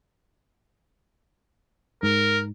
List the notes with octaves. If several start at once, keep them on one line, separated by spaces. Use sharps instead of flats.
G#2 A#4